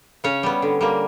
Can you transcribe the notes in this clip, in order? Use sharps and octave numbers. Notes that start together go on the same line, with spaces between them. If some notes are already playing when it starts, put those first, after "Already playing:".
C#3 C#4 C#5
G3 B3
D3
G3 A#3